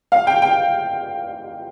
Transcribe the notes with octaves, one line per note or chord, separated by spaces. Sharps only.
F5
G5
G5